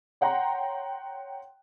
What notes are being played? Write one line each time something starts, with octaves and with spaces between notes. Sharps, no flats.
C#5 F#5 G5 A#5 C6